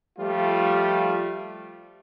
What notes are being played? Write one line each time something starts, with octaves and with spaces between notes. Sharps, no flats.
F3 G3 A3 F4